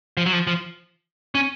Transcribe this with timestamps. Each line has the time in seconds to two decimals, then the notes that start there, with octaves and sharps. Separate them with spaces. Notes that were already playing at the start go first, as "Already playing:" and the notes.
0.17 F3
0.26 F#3
0.33 F3
0.47 F3
1.35 C#4